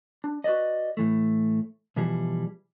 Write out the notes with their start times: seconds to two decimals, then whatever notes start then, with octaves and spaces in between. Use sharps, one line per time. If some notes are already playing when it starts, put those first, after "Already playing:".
0.24 D4
0.44 F#4 B4 C5 D5 D#5
0.97 A2 E3 A3
1.96 B2 E3 F3 G3 G#4